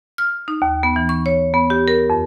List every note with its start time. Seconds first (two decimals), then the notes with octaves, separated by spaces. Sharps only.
0.18 F6
0.48 D#4
0.62 D#2
0.83 B3
0.96 E3
1.09 C#6
1.26 C#5
1.54 B3
1.70 G4
1.88 A#4
2.10 F2